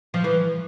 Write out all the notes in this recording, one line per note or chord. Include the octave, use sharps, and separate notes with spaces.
F3
E3